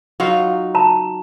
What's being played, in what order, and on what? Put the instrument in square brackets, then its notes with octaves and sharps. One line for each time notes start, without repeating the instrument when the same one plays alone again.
[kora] F#3 D#4 F4
[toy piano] A5 A#5